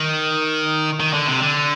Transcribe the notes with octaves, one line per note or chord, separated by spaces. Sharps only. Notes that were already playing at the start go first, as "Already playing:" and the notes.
Already playing: D#3
D#3
D3
C3
D3